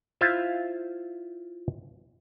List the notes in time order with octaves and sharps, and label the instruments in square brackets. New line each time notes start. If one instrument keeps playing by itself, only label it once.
[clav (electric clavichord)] E4 F4 C5 E5 F5